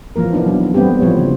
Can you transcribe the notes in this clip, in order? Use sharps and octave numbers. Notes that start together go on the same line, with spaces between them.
E3 F3 A#3 A#4
E3 B3 D4 D#4
F#3
G3 A3 B3 C4 G4
E3 F3 G3 B3 C#5
C#3